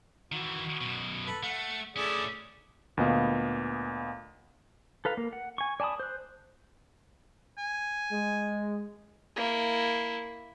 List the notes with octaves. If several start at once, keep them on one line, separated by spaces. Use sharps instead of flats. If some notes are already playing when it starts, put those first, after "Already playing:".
D#3 E3 F#4
F#2 B2
A4 B4
A3 F#5
A3 C#4 E4 G#4 D5
D2 A#2 B3 D#5 F5
A4 B4 F5 A#5
A#3
F#5
G#5 C#6
D5 G#5 A5 B5 D#6
C5 F#6
G#5
G#3
A#3 E4